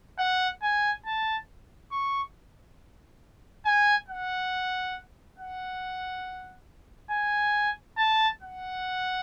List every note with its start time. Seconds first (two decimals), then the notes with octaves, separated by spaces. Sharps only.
0.19 F#5
0.62 G#5
1.06 A5
1.92 C#6
3.65 G#5
4.08 F#5
5.38 F#5
7.11 G#5
7.98 A5
8.41 F#5